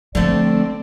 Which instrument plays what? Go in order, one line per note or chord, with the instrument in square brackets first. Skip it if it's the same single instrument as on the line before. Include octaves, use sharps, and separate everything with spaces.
[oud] D3 A3 [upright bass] F3 G3 [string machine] C4 [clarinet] D5